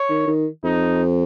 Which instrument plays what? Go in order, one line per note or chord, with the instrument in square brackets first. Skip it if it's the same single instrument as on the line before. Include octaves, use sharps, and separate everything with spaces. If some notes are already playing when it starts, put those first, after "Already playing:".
Already playing: [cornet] C#5
[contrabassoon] D#3
D#3
[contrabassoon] F2 [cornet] D#4